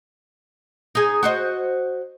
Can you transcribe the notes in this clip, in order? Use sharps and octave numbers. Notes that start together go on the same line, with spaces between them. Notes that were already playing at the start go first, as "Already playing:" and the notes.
D#4 G#4
F#4 C5 D#5